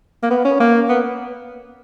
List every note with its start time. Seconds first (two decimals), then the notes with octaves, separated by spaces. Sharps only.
0.23 A#3
0.31 B3
0.45 C#4
0.60 A#3
0.89 B3